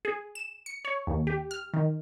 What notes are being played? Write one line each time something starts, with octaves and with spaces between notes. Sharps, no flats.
G#4
E7
C#7
C#5
D#2
G4
F6
D#3